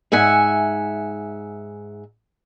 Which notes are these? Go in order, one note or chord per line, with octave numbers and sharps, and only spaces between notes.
G#2 E5 F#5 G#5